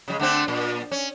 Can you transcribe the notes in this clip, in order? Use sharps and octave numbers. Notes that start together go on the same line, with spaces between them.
C#3 G3 G#3
D3 A3 C4
A#2
C#4